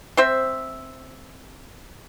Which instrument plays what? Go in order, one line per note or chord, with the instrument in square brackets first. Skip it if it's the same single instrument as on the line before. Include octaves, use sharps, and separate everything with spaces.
[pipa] C4 C5 E5